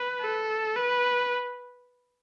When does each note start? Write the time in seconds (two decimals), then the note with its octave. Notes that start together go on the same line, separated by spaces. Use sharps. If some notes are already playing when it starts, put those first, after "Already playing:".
Already playing: B4
0.22 A4
0.76 B4